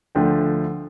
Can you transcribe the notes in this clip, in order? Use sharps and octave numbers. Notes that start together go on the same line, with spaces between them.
D2 D3 F3 A3 D4 G5